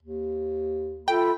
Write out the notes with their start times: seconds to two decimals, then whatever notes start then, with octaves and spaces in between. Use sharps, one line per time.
0.03 D#2
1.08 F4 A4 E5 G5 B5